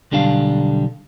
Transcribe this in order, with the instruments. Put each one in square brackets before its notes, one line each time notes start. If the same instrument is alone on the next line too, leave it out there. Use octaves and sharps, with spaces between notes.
[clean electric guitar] B1 D3 G3 D4 F5